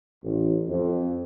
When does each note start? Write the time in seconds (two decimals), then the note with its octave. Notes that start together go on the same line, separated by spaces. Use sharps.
0.24 A1
0.68 F2